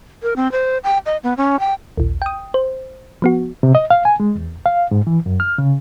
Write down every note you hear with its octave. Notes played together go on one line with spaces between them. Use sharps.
A#4
C4
C5
G5
D#5
B3
C#4
G5
A#1 D#2
G5 D#6
C5
F3 B3 F#4
C3
D#5
F5
G#5
G#3
E2
F5
G#2
E3
F#2
F6
C#3